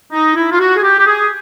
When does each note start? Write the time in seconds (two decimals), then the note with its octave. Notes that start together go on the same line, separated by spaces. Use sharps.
0.12 D#4
0.35 E4
0.52 F4
0.59 F#4
0.76 G#4
0.83 G4
0.99 G4
1.06 G#4